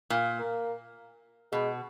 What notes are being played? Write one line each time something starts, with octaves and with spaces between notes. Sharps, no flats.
A#2
A#3
B2 G#3